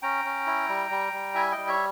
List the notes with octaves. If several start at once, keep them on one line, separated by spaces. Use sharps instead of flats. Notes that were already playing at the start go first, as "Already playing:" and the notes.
C#4 G5 A#5
C#4
E4
G3
G3
G3
E4 E5 G#5
D#5 G5
G3
C#5 E5